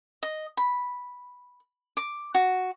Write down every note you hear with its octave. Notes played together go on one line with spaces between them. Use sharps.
D#5
B5
D6
F#4